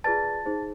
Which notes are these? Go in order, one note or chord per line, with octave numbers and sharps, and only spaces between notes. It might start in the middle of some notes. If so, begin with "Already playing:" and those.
F4 G#4 B4 D5 A5 A6
D#4 G#4 C5